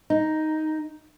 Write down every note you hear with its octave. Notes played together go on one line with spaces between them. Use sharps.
D#4